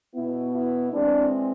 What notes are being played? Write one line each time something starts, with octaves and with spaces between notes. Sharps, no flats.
B2 B3 E4
E4
E3 G#3 C4 D4